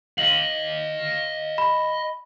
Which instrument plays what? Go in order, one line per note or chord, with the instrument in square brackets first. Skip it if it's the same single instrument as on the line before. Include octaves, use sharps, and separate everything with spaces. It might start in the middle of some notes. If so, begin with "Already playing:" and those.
[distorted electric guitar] D#5 F5 [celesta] F#7
[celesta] B5